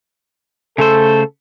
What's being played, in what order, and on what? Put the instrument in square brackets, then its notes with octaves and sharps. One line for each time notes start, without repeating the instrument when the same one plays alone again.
[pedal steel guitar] C#3 A3 C5 [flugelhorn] A4